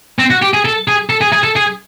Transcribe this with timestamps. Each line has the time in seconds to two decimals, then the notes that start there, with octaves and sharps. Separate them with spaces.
0.19 C4
0.30 F#4
0.42 G4
0.53 G#4
0.65 A4
0.88 G#4
1.09 A4
1.21 G#4
1.33 G#4
1.43 A4
1.56 G#4